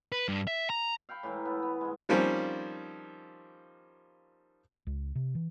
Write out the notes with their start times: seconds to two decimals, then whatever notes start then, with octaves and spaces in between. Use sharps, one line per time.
0.12 B4
0.28 G2
0.47 E5
0.70 A#5
1.09 F5 G5 B5 C#6
1.23 A2 E3 A#4
1.45 B3
1.62 B3
1.81 G#2 G#3
2.09 D#3 F3 G3 A#3 C4 C#4
4.87 C#2
5.15 C3
5.35 E3